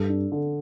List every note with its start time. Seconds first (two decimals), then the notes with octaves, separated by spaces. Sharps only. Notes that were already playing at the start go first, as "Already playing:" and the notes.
Already playing: G2 A4
0.09 D4
0.32 D3